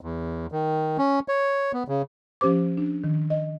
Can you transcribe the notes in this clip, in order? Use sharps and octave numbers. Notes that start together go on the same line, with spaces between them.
E2
D#3
C#4
C#5
B3
C#3
F3 C#4 G4 C5 D6
D4
D#3
D#5